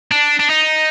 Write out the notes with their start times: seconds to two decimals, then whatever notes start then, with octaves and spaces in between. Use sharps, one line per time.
0.11 D4
0.39 D4
0.50 D#4